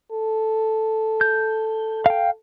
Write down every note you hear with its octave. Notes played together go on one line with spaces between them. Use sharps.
A4
G6
F5 G5